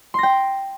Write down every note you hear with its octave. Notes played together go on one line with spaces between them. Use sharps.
G5 C6 A#6